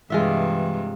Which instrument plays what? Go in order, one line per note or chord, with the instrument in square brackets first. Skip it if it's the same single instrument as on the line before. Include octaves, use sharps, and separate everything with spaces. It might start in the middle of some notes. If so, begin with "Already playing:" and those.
[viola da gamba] G2 C3 [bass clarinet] E3 [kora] G#3 F4 E5